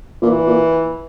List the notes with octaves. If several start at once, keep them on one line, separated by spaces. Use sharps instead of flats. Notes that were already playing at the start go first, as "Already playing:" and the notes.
A#2 E3
A#2